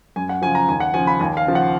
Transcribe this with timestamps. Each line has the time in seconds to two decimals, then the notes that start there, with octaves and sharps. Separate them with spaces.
0.16 F#2 G#5
0.29 F#5
0.42 C#3 F3 G#5
0.55 A#5
0.69 D#2 G#5
0.80 F#5
0.94 C#3 F3 G#5
1.07 B5
1.19 D#2 G#5
1.37 F5
1.46 C#3 F3
1.55 F#5